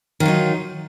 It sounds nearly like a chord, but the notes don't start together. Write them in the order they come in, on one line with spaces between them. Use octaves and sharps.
D#3 F4 F#3 D#4